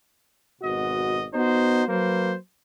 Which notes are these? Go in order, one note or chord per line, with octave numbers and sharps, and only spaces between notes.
G#1 B2 F#4 D#5
B3 D#4 F#4 C5
F#3 A#3 B4 C5